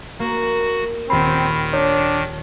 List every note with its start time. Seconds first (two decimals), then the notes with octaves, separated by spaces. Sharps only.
0.19 A#3 F#4
1.10 D#1 D#3 C4 B5 C7
1.73 D4 C#5